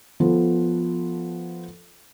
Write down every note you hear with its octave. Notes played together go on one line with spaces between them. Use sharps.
F3 B3 F4 A4